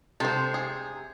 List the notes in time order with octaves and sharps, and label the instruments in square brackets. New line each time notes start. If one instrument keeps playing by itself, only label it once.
[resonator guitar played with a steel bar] C3 [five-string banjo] A4 C5
[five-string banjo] G#4